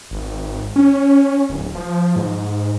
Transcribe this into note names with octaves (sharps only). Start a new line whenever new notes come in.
G#1
C#4
D1
F3
G#2